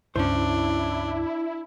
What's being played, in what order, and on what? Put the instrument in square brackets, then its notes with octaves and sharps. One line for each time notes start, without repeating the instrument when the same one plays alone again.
[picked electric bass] C#2 G2 [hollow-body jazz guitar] C#4 C5 [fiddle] D4 [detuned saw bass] E4